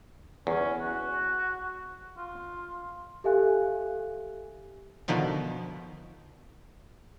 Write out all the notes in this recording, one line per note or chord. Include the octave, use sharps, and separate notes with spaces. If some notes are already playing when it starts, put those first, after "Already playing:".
E2 C#4
F#4
F4
G4 A4 E5 F5 G#5 F#6
B2 D3 D#3 F3